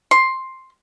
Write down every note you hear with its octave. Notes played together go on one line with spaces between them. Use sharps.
C6